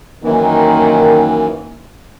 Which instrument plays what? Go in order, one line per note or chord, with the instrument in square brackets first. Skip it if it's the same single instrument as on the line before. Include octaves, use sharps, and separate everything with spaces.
[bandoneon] F#2 E3 [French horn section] D#3 A#3